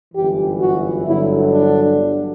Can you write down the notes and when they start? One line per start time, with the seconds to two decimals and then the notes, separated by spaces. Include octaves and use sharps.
0.13 G1 F#2 E3 G4
0.60 F#4
1.05 G1 G2 D3 F#3 E4
1.52 D4
1.98 G1 G2 F#3